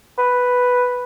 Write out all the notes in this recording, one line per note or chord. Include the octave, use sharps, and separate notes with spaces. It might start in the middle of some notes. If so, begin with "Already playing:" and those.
B4